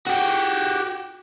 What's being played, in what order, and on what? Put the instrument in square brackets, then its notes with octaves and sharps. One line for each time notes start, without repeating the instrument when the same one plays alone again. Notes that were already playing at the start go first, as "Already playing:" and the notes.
[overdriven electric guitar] F#4 G4